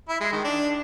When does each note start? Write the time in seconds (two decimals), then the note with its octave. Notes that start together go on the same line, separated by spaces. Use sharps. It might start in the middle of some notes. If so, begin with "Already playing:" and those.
0.09 E4
0.21 G#3
0.33 D#3
0.44 D4